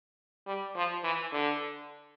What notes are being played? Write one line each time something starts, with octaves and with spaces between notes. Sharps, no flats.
G3
F3
E3
D3